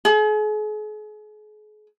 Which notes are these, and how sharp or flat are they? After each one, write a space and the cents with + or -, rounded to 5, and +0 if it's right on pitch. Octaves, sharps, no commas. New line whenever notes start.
G#4 +40